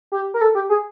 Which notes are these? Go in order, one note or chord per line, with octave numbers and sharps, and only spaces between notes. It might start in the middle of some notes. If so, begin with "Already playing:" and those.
G4
A#4
A4
G4
G#4